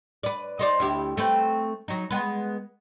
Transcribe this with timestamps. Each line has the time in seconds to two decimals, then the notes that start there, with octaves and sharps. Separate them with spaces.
0.23 B4 D5
0.59 D#4 C5 D5
0.80 D2 E4 G4
1.17 A3 C4 B4
1.88 F#3 D#4
2.11 G#3 B3 B4